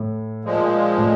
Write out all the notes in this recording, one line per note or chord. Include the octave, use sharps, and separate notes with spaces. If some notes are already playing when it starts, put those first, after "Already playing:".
Already playing: A2
A#2 F3 G#3
A2